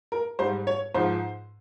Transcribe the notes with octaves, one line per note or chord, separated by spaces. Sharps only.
A#4
G#2 G3 C5
C#5
G#2 F3 C5